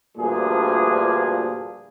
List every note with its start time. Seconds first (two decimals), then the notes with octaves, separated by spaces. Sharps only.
0.18 D2 G2 A#2 F3 D4 G#4